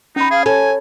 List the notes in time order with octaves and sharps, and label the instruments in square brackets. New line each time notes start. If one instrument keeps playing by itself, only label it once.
[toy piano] C#4 B5 [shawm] D#4
[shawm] G#4 [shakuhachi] F5
[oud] A4 [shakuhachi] C#5 [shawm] G#5